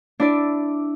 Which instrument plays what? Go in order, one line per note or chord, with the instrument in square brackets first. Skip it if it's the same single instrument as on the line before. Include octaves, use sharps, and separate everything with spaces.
[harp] D4 E4 D5